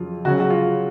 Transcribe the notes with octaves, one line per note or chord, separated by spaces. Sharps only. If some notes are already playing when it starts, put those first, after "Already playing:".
Already playing: F2 C#3 F#3 F4
C#2 C#3 F#3 F#4
F#4
F4